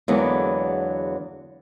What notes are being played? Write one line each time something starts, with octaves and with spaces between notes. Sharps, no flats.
E2 D3 F#3 G#3 A#3 B3